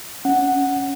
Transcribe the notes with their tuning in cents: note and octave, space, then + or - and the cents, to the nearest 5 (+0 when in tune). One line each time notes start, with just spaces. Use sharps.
C#4 +0 F#5 +0